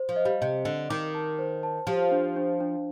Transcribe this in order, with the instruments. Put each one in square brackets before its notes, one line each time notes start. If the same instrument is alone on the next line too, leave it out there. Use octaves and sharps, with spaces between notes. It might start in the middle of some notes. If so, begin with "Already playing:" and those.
Already playing: [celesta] C5
[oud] F3
[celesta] D#5
[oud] G3
[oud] C3 [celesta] D#5
[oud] D3 [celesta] D#5
[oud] D#3 [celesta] D6
[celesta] A5
C5
A5
[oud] F3 [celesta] G4
[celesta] D4
D4
D4